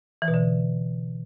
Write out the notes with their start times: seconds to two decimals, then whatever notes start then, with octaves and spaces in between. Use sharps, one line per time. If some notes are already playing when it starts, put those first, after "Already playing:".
0.22 E3
0.28 B2
0.34 D3